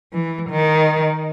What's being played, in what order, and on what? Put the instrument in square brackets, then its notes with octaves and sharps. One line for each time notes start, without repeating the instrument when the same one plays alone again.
[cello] E3
D#3